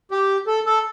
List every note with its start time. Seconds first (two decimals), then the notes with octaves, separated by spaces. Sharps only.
0.11 G4
0.47 A4
0.66 A4